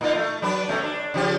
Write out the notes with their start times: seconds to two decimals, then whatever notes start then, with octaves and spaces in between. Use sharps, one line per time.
0.01 A#2 D#4 F4
0.15 A3
0.42 F#3 D4 B4
0.69 B2 A3 C#4
0.84 D4
1.14 C#3 F3 G4